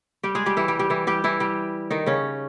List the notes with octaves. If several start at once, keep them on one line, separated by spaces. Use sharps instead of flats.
G3 G4
G#3 G#4
G3 G4
E3 E4
G3 G4
G3 G4
E3 E4
G3 G4
E3 E4
G3 G4
D#3 D#4
C#3 C#4